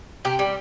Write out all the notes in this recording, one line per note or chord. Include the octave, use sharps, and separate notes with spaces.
C3 G4
G3